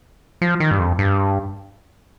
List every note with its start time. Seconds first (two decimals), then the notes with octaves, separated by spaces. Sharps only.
0.41 F3
0.60 D#3
0.71 G2
0.79 F2
0.99 G2